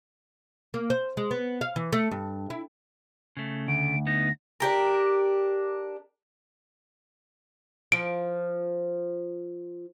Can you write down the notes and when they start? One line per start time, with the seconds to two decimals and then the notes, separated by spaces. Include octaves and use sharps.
0.74 A#3
0.90 C5
1.17 G#3
1.31 B3
1.61 F5
1.76 E3
1.93 A3
2.11 G2
2.50 E4
3.37 C#3 A3
3.68 D2 D7
4.07 B3 D#4 A#6
4.60 D4 G4 A#4
7.92 F3 D7